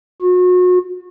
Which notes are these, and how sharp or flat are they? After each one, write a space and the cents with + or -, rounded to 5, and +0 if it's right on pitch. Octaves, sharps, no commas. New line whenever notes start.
F#4 -35